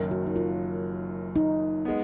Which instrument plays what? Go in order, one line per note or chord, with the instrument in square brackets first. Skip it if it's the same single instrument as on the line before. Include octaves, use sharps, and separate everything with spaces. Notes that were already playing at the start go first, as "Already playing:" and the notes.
Already playing: [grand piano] F#1 F#2 D#3
[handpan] F#4
D#4
F4
D#4
[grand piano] G#3 B3